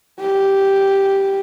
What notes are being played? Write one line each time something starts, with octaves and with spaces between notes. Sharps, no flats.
G4